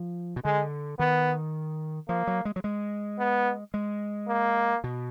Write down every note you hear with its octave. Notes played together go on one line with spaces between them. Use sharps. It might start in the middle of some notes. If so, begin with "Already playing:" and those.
Already playing: F3
B2
D3 G#3
D#3 B3
F3 A#3
F#3
G#3
F#3
G#3
B3
G#3
A#3
B2